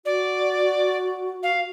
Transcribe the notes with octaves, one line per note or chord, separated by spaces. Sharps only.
F#4 D5
F5